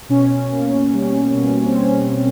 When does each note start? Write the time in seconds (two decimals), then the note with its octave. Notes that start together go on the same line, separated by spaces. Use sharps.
0.09 B2 C#4
0.51 A#3
0.93 G3
1.34 B2
1.65 C4
1.75 B2 C#4